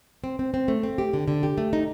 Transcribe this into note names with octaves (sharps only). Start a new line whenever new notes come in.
C4
C4
C4
A3
C4
G4
D3
D3
G4
A3
D#4